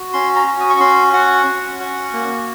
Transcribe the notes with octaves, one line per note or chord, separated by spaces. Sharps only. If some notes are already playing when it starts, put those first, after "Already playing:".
Already playing: F#4
C#4 C6
A#5
F#4
D#6
C#6
C#4 C6
F#4 F#5
C#4
F#4
A#3